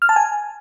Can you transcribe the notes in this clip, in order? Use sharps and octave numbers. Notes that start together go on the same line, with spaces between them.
F6
A5
G#5